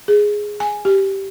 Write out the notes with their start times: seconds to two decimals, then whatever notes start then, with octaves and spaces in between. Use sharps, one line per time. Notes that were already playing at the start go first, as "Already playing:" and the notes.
0.08 G#4
0.60 G#5
0.85 G4